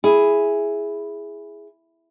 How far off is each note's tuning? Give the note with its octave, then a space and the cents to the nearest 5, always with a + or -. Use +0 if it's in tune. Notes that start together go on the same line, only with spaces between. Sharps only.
E4 +0 G#4 +0